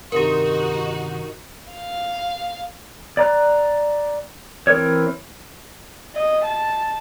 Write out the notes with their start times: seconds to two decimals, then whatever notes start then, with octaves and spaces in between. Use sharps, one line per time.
0.12 G2 C3 D#3 D#4 F#4 G4 A#4
1.73 F5
3.17 D5 A#5 F#6
4.67 E3 C4 A4 A#4 C#5
6.14 D#5
6.45 A5